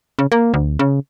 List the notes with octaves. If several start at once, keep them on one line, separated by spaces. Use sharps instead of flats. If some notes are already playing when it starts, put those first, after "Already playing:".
C#3
A#3
D2
C#3